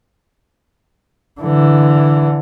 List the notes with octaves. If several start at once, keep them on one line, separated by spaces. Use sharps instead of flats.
D3 E3